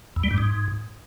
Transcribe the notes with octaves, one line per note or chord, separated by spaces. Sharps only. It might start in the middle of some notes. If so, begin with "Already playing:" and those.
E2
G3
G2
G#2